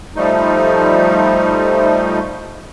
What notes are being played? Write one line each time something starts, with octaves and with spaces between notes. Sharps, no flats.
F3 G3 A3 D#4